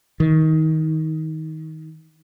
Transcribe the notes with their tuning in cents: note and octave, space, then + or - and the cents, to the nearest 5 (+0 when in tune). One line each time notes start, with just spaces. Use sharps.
D#3 +20